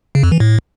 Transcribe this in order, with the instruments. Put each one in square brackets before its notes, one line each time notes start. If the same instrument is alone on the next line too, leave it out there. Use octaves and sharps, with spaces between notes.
[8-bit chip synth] C#3
F2
E3
A2